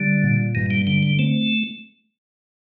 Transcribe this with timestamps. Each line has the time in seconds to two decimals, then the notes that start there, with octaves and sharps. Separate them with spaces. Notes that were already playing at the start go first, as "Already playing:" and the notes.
Already playing: D3 G3 D4
0.23 A#2
0.55 G2 D#3
0.71 G3
0.87 D3 G3
1.03 G3
1.19 A3 C4